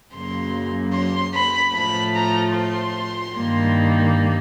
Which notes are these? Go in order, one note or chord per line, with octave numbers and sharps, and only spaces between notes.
F#2 C#3 F#3 A#3 C6
C6
B5
A2 F3 A3 B5
A#5
C6
G2 D#3 G3 A#3